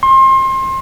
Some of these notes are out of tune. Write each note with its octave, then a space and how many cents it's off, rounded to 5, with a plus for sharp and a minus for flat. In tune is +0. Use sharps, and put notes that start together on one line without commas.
C6 +30